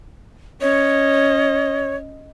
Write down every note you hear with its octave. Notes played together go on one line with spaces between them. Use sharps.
C#4 C#5 D#5